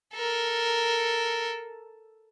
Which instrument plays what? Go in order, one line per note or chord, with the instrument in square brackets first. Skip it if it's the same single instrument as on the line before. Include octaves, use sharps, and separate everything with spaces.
[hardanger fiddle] A4 A#4